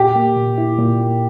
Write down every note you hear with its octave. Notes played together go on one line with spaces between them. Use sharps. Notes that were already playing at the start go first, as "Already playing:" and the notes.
Already playing: A#2 G4
A#3
A#2
E4
A#2
A#3